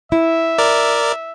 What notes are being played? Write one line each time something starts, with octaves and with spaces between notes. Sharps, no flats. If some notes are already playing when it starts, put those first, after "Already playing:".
E4 E5
A#4 D5